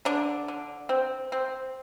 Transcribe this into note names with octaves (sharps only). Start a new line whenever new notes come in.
D3 D4
D3
C4
C4